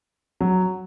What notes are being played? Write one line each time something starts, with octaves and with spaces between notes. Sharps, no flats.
F#3